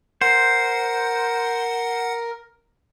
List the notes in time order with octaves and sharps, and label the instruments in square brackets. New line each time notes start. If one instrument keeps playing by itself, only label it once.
[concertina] A#4 [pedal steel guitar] C5 [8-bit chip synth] F#5